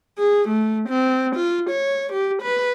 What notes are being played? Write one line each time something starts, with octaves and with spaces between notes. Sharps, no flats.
G#4
A3
C4
F4
C#5
G4
B4